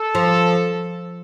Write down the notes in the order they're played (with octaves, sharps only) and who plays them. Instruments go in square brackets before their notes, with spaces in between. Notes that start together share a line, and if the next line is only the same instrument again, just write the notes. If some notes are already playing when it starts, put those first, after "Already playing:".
Already playing: [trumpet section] A4
[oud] F3